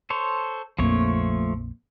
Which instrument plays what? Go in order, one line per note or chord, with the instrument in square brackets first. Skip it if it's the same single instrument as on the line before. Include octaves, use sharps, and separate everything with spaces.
[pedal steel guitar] A4 C5 C#5
[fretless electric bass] A#1 F2 A#3 [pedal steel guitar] F3 A3 C#5